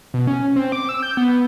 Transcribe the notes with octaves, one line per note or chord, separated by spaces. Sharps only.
B2
C#4
C4
D6
E6
G6
B3